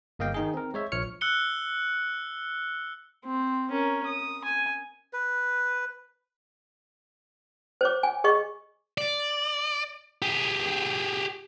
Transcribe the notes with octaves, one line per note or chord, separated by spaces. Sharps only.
G1 A#3 D#5 F5 G5
D#3 D#4 G#4
C4 A#4
G#3 C#5 E5
A#1 F3 C#5 F6 C#7
E6 F#6 C#7 G7
C4
C#4 A#4
D#6
G#5
B4
C5 C#5 D6
G#5
G#4 D#5 C#6
D5
G4 G#4